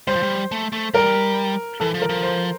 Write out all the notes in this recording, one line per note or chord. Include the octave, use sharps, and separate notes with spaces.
G3 C5
F3
G3
A3
A3
G3 A#4
E3 A4
F3
A#4
F3
C5